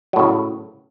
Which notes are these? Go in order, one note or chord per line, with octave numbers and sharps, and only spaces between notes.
A2 C#3 F#3